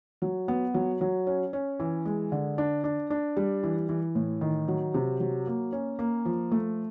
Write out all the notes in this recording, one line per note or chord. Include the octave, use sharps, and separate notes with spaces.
F#3
B3
F#3
F#3
C#4
C#4
E3
G#3
D3
D4
D4
D4
G3
E3
E3
A2
D#3
F#3
C3
F#3
A#3
C#4
A#3
F3
A3